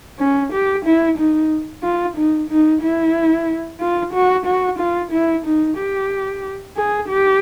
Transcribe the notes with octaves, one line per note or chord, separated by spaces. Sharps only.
C#4
G4
E4
D#4
F4
D#4
D#4
E4
F4
F#4
F#4
F4
E4
D#4
G4
G#4
G4